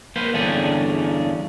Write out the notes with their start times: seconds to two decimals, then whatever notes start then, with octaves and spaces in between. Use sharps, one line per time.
0.16 A#3 B4 C5
0.34 E2 G2 D3 C#4 G#4 A4